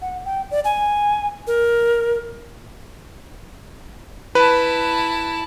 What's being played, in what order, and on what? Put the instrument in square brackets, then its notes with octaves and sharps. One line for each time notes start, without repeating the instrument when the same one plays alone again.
[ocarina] F#5
G5
D5
G#5
A#4
[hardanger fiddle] E4 A5 [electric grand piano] B4